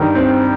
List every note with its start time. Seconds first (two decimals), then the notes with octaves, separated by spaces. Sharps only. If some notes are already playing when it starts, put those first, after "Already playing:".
Already playing: G2 D#3
0.15 C4